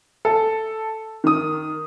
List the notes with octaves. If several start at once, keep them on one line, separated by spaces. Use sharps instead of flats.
A4
D#3 D#6